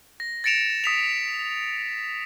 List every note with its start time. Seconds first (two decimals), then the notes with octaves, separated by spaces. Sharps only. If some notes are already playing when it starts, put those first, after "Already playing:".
0.20 A#6
0.44 A6 A#6 C#7 D7 E7 F7
0.84 D#6 B6 F7